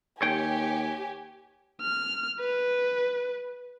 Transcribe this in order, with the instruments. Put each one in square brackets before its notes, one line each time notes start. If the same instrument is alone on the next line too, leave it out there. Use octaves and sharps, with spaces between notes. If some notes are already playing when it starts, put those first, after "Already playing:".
[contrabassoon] D#2 [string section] G4 [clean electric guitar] C#5 G5 [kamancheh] G#5
[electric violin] F6
B4